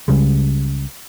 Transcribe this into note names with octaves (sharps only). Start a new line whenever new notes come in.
C#2 C#3 G3 G#3